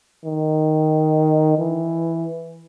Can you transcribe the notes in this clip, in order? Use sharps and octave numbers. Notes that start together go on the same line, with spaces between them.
D#3
E3